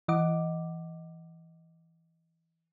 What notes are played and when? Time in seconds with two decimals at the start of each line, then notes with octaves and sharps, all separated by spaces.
0.08 E3 D#5 F#5 D6